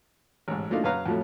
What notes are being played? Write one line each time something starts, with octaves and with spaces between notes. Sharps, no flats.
A1 G#2
F#3 A3 A#3 D4 D#4 F4
F#2 B4 C#5 F5 A#5
F2 A2 F3 F#3 A3